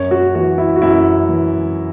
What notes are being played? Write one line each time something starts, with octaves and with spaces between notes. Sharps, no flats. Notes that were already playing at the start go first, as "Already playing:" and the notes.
Already playing: F#2 C#5
F#4
E3 F#4
E4
F#4
F#2 E4
E3